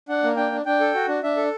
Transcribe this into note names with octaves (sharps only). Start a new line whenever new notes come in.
D4 F#5
A#3
D4 G5
D4
D4 G5
A4
F#4
D4
D4 E5
A4